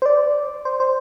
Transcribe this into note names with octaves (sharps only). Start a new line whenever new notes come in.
C5
D5
C5
C5